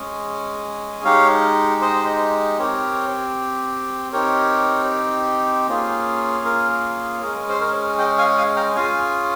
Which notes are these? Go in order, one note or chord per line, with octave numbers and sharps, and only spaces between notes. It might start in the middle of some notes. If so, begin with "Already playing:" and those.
Already playing: G#3 C#4 G#4
G#3 D#4 G4 C#5 F5
C5 D#5
C4 G4 A#4 C#5
C4 D#4 G4 A#4 C#5
A#3 C#4 F4 G#4
A#4
G#3 C#4 G#4 A#4
C5
A#4 C#5
D#5 G5
F5 G#5
F5 G#5
G5 A#5
C#4 F4 G#4 F5 G#5